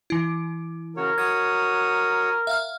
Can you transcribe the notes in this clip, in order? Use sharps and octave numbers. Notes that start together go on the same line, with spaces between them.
E3 E4
C#3 F#4 A#4 C#5
F#4 C#5 D#6 G#6
E5 F5 F6